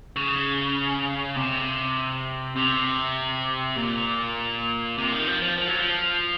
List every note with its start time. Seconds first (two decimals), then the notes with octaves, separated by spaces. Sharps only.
0.16 C#3
1.36 C3
2.57 C3
3.77 A#2
4.98 C3
5.12 D#3
5.27 F3
5.42 F3
5.58 F3
5.67 F#3
5.79 F3